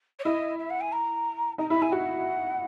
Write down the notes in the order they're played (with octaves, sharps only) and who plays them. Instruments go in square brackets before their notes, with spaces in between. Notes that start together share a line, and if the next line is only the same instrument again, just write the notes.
[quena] C#5
[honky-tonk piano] E4 [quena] D#5
[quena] E5
F#5
G#5
A#5
[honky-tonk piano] D#4 [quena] A#5
[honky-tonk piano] E4 [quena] B5
[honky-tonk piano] E4 [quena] G#5
[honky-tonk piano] F#4 [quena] F#5